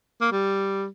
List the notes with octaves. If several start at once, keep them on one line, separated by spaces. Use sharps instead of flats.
A#3
G3